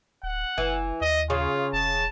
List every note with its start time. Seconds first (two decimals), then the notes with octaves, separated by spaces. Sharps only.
0.23 D1 F#5
0.58 F#1 E3
1.01 D#2 D#5
1.30 C#3 F4
1.73 E1 A5